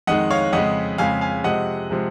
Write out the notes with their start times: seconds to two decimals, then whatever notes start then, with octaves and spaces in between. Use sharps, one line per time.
0.07 F2 D#3 G#3 D#5 F#5
0.30 C#5 F5
0.53 F2 C#3 G#3 D#5 F#5
0.98 F2 C#3 G#3 F5 G#5
1.21 F5 G#5
1.44 C3 F3 G#3 D#5 F#5
1.91 C3 F3 G#3